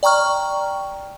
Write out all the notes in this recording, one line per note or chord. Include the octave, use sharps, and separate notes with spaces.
D5 G5 A#5 C#6 F6